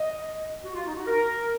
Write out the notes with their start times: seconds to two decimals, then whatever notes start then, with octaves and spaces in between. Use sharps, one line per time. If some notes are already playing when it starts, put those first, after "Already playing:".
Already playing: D#5
0.64 F#4
0.75 F4
0.86 D#4
0.96 F#4
1.07 A#4